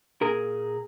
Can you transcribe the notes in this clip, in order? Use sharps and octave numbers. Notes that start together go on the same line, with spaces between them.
A#2 G#4 A#4